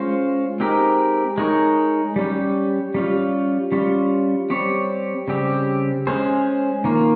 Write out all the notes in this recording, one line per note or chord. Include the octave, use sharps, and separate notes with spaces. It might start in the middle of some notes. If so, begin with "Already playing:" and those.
Already playing: G#3 C#4 F4 C5
G#3 C4 D#4 G4 A#4
G#3 D#4 A#4 C#5
G3 C#4 G4
G3 C#4 F4
G3 C#4 F4
G3 C4 G4 C#5
C#3 G3 C4 G4
G#3 C#4 G#4 C5
D#3 A#3 F4